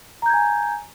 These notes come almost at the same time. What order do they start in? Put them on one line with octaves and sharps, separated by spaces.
A#5 G6 G#6 G#5